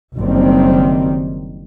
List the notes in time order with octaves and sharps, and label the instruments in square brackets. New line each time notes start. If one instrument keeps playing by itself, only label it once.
[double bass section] F#1 D#3 G3 C4